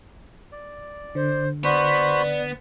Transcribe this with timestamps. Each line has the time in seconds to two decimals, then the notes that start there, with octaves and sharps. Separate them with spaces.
0.52 D5
1.15 D3 C5
1.64 B3 F#4 C5 D5 B5